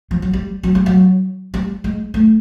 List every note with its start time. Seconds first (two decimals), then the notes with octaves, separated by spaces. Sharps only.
0.11 F3
0.22 F#3
0.33 G3
0.63 F#3
0.75 G3
0.86 F#3
1.54 G3
1.84 G#3
2.14 A3